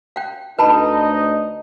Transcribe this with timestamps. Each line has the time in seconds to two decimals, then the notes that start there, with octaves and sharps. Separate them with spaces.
0.16 F5 G5
0.59 D2 D#4 B4 D#5 A5 B5